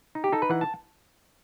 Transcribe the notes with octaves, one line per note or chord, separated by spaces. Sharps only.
D#4
G4
D#4 A4
B4
E3 F#5
A5